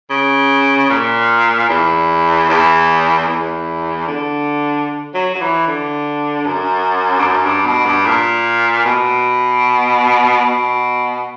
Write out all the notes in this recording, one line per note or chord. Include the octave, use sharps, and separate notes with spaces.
C#3
A#2
E2
E2
E2
D3
F#3
F#3
E3
D3
F#2
G2
F#2
G2
B2
G2
A#2
B2
B2